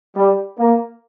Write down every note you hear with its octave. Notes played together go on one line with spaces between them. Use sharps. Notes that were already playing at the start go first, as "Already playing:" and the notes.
G3
A#3